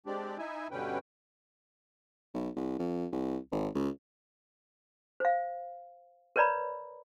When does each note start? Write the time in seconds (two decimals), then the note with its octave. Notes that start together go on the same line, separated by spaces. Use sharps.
0.06 G#3 C4 D4 G4 D5
0.38 D#4 E4 E5 G#5
0.71 G2 B2 D3 C#4 B4 G5
2.34 B1
2.56 C2
2.79 F2
3.12 C2
3.52 G#1
3.75 C#2
5.20 C5 F5
6.36 A#4 B4 C#5 D5 A#5 B5